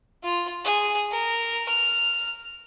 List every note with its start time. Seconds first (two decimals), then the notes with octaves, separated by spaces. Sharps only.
0.23 F4
0.65 G#4
1.11 A#4
1.68 F6